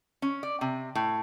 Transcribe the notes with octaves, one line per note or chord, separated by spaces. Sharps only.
C#4
D5
C3
A2